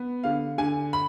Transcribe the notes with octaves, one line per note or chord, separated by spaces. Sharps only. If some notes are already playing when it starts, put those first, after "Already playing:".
Already playing: B3
D3 F5
D3 G#5
B5